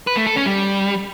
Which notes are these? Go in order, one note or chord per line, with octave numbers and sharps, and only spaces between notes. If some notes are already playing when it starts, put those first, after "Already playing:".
B4
A3
A4
C#4
G3